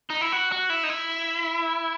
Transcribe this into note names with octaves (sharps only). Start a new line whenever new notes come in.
D#4
E4
F#4
F#4
E4
D#4
E4